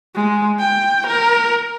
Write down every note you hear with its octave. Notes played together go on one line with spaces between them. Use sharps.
G#3
G5
A#4